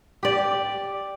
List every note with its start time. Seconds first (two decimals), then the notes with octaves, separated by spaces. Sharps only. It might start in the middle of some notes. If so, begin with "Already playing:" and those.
0.23 G4 D5